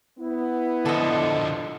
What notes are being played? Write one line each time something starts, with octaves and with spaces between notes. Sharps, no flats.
B3 E4
D3 F3 A4 D#5